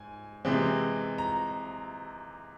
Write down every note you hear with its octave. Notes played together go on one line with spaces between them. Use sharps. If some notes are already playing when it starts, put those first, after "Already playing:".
Already playing: G#2 G#5
C3 E3 G#3 C4
A#5